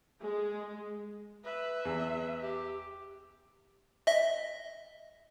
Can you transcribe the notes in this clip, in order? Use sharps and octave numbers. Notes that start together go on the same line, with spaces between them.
G#3
B4 E5
E2
G4
D#5 E5